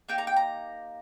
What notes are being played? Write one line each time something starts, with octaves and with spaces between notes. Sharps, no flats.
A#3 D#4 G4 G5
A#5
G5
A#5